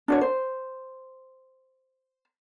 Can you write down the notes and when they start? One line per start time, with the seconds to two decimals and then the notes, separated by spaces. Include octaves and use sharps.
0.08 D4 F#4 C#5
0.21 C5